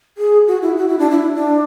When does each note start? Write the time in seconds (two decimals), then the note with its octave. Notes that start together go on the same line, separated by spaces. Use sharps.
0.18 G#4
0.48 F#4
0.62 E4
0.77 F#4
0.88 E4
0.99 D4
1.10 E4
1.35 D4